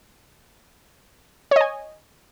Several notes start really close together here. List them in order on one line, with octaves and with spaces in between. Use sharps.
C#5 D#5 G#5